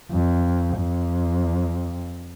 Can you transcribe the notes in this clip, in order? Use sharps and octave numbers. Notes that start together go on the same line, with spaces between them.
F2
F2